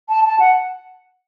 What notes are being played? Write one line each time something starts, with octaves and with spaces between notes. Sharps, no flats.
A5
A5
F#5